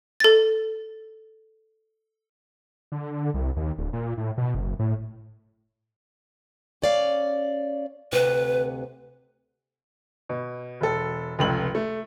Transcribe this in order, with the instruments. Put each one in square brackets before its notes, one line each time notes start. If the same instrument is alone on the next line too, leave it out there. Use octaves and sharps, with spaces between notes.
[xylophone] A4 A6
[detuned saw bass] D3
C2
D#2
D1
A#2
A2
B2
F#1
A2
[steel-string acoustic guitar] C#4 D5 F5
[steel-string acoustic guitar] D2 C3 [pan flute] B4
[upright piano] B2
E1 A4
F1 C#2 F#7
A3